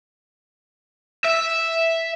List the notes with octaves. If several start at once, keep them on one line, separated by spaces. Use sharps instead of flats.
E5